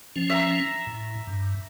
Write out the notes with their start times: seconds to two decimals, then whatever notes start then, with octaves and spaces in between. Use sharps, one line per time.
0.16 F3 C#4
0.30 E5 A#5
0.87 A2
1.27 G2